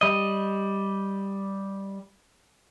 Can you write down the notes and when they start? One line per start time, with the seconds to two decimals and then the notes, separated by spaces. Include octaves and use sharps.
0.01 G3 D#5